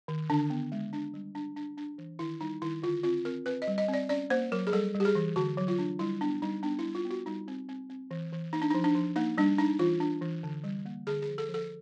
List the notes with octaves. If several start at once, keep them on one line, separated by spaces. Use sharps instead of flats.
D#3
D3 D4
B3
G#3
D4
G3
D4
D4
D4
E3
D#3 E4
G3 D#4
D#3 E4
D3 F4
C4 F4
C4 A#4
C4 B4
D#5
G3
D#5
C4
D5
C#4 D5
A#3 C5
F#3 A#4
G#4
G3 A4
G3
G4
G#4
E3
D3 F#4
F#3
F4
D4
G3 E4
B3 D4
G3 D#4
B3 D4
E4
G3
F4
B3
F#4
G3 D#4
C4
C4
C4
E3
E3
A#3 D#4
D4
D#4
F3
D4
F3
A#3 D#4
G3 D4
D4 D#4
E3 F4
D4
E3
D3
G3
A#3
D3 G#4
G#4
F3
A4
F3
A4